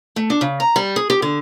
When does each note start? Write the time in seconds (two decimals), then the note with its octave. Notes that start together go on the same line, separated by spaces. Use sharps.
0.16 A3
0.30 D4
0.41 C#3
0.60 A#5
0.76 G3
0.96 G#4
1.10 G4
1.22 D3